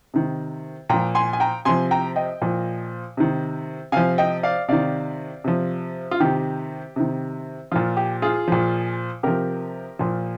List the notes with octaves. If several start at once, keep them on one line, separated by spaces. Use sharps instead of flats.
C3 D#3
A#2 F3 G5 A#5
G#5 C6
G#5
G5 A#5
C3 F3 G#5 C6
G5 A#5
D#5 G5
A#2 F3
C3 D#3
C3 F3 F5 G#5
D#5 G5
D5 F5
C3 D#3 D5 F5
C3 F3
F4
C3 D#3 G4
C3 D#3
A#2 F3 F4
G4
F4 G#4
A#2 F3
C3 F3 G4 A#4
A#2 F3